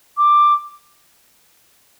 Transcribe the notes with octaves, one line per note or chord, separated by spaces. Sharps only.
D6